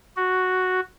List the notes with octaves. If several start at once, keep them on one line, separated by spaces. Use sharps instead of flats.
F#4